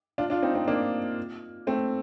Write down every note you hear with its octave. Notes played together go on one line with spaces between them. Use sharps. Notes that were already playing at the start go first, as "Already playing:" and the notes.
D4 F4
D4 F4
C4 D#4
C4 D#4
A#3 D4
A3 C4